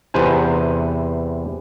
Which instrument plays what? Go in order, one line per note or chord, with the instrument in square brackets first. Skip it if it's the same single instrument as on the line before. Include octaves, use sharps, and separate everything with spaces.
[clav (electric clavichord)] E2 C3 B4 C5 G#5